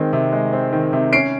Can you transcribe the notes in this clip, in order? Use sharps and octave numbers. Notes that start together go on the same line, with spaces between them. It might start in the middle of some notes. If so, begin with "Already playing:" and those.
Already playing: D#3 G#3 C4
C3
G#3
C4
D#3
C3
C#4 C7 D7